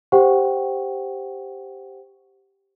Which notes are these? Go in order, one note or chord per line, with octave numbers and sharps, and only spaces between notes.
G4 C5 F#5 G5 C#6